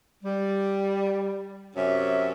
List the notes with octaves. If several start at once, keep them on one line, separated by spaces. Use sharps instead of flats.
G3
F#2 C3 C#4 C#5 E5